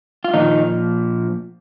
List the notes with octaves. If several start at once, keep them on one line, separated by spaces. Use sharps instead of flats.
F4
A#2 D#3 F3 D#4